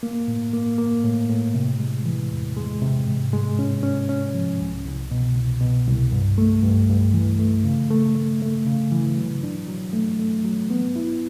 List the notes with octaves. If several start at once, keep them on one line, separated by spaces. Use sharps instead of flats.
A#3
A2
A#3
A#3
A2
A2
C3
G#3
E3
E2
G#3
C3
G#2
G#3
C#4
C#4
C#4
F3
C2
C2
B2
C2
B2
C2
G2
A3
G2
G2
E3
A3
C#3
A3
A3
A3
C#3
E3
F#3
D4
F#3
A3
A3
F#3
B3
E4